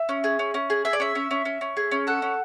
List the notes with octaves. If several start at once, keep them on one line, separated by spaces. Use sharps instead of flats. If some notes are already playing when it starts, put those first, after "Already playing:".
Already playing: E5
C#4
G#4
C#4
C#4
G#4
G#4 E5
D5
C#4 E5
C#4
C#4
C#4
C#4
G#4
C#4
A4 F#5
C#4